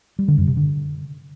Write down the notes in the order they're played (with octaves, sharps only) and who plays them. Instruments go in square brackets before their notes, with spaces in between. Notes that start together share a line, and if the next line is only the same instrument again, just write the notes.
[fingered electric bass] G3
D3
F#2
C3
D3